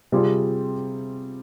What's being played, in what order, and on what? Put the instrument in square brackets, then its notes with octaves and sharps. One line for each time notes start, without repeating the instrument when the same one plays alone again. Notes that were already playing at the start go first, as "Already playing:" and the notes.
[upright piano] C3 G3 C4 F4 G#4